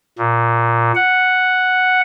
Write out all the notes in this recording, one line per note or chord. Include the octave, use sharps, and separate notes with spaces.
A#2
F#5